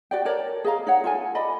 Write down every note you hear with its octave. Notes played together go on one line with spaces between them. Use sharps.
F#4 D5 G5
A4 A#4 C#5 D5
G#4 D#5 F5 A#5
D#4 C#5 F#5
F4 A4 G#5
D5 D#5 B5